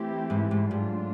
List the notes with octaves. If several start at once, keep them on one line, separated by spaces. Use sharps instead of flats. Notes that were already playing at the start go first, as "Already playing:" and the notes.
Already playing: E3 A3 C4 E4 G4
G#2
G#2
G#2 F#3 A3 D4 F4